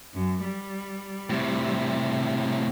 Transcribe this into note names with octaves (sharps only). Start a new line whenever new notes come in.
F#2
G3
A2 C3